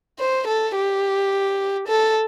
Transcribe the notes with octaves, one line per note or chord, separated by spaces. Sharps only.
C5
A4
G4
A4